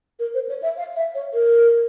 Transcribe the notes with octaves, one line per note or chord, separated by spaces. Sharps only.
A#4
C5
C#5
E5
F5
E5
C#5
A#4